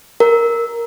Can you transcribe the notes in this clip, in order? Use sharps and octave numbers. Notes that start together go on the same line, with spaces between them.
A#4